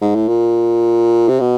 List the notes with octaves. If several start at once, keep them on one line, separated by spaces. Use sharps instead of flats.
G#2
A2
A#2
C3
B2